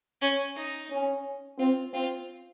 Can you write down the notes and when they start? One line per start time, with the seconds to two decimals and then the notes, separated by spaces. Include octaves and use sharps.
0.22 C#4
0.56 D#4
0.90 C#4
1.58 C4 F4
1.94 C4 F4